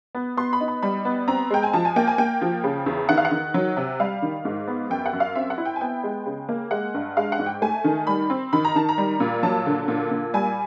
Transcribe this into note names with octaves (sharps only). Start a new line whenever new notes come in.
B3
B3 C6
B5
D#4
B5
G3 B5
B3
C4 A#5
G#3 G5
G#5
F3 A5
G#5
A#3 G5
G#5
A#3 G5
F3
C#3
E2
D#3 F#5
F5
F#5
D#3
F#3
C3
G3 F5
D#3
G#2
B3
F#2 G5
F#5
F#2
F5
C4 E5
F#5
E4
G5
G#5
B3 G5
G#3
C#3
A#3
G#3 F#5
G2
G#3 F5
F#5
G#2
G5
A3 G#5
D#3
G3 B5
C4
D#3 B5
A#5
D#3 A5
A#5
G3
A#2
F#3 A5
D3
A#2
A#2
G3 G#5